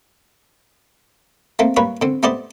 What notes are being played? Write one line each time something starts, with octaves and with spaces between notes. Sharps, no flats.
A3 A#3 C4
G3 A#3 B4 C#5
D3 C4
A3 B3 G4 C5 D5 D#5